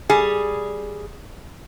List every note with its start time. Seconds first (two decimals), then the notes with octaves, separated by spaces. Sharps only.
0.10 G3 G#4